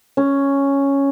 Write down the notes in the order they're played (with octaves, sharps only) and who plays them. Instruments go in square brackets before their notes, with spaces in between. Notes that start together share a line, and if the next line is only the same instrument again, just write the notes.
[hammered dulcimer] C#4